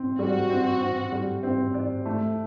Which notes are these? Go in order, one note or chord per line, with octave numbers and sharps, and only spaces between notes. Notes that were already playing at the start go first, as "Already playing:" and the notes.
Already playing: C4
G3 F#4
C4
C4
G3
C4
D5
A3